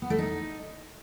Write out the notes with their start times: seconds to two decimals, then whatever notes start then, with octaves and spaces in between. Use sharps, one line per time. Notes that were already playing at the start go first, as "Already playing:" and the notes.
0.02 B3
0.10 A3
0.19 D#4